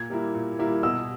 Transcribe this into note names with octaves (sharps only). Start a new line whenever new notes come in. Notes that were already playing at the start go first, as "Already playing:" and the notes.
Already playing: A#2 G#6
G3 A#3 E4
A#2
G3 A#3 E4
B2 E6